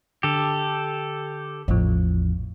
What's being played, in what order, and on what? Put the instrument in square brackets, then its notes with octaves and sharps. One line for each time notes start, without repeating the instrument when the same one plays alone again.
[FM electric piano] D3 [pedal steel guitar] G4 A4
[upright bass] A1 [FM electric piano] E2 F3